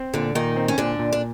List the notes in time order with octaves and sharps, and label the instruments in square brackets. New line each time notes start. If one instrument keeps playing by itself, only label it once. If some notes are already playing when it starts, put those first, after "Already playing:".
Already playing: [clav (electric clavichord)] C4
[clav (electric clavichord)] A#2 [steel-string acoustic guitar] D3 D4
[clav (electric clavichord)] A#2 [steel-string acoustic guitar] D#3 D#4
[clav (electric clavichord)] C4
[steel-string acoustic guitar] C#4
[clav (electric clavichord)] A#2 [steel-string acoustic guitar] D3 D4
[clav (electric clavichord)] A#2
[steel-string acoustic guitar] D4